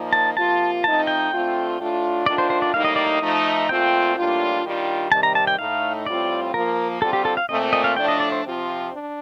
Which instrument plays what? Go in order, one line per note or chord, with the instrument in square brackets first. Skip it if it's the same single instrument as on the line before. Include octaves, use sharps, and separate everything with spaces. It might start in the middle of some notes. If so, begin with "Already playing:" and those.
Already playing: [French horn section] A#2 F3 A#3 D#4
[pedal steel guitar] A5
[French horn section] C3 F3 A#3 F4 [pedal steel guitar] A5
[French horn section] F3 A3 C4 D#4 [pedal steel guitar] A5
[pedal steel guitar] G5
[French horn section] D3 A3 C4 F4
A2 A3 D4 F4
[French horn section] D#3 A3 D4 F4 [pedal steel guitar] D5
[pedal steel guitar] C5
C5
D5
[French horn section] A2 G3 A#3 D#4 [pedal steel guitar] F5
[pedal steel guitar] D#5
D5
D#5
[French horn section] F3 A3 D#4
[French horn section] A#2 A3 C4 F4 [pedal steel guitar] G5
[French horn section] A2 G3 A#3 D4 F4
D#3 G3 D4 F4
[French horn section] C3 D#3 G3 [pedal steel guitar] A5
[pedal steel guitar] A#5
A5
G5
[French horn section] A2 A3 D#4 [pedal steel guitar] F5
[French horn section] A2 G3 C4 F4 [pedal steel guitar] D5
[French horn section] F3 A#3 F4 [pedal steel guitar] A#4
[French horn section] D3 G3 C4 F4 [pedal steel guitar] A4
[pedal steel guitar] G4
A4
F5
[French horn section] A#2 A3 C4 [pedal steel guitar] D#5
[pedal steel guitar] D#5
F5
[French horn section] A2 F3 A3 D4 [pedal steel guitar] G5
[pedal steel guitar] D#5
D5
C5
[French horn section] C3 F3 C4 F4
D4